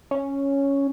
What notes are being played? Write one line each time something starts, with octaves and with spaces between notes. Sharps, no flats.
C#4